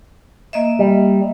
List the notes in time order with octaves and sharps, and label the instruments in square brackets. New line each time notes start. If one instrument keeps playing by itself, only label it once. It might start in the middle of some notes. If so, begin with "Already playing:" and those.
[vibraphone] A#3 D#5 E5
[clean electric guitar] G3